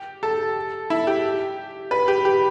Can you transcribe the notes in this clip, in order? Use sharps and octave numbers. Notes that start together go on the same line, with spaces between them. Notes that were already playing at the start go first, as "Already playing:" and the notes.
Already playing: G4
A4
E4
G4
B4
G4
G4